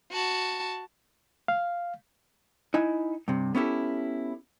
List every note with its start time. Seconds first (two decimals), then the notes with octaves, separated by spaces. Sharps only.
0.12 F#4 A5
1.48 F5
2.74 D#4 E4 G#5
3.28 G2 C3
3.55 B3 C#4 E4 G4 A4